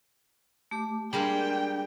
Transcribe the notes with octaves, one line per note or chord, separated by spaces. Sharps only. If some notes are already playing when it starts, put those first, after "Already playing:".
A3 G4 D6
G3 G#3 A#3 D4 G#4 G5